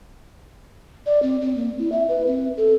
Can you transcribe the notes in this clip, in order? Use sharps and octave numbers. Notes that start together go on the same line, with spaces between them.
D5
C4
C4
A#3
E4
E5
B4
C4
A4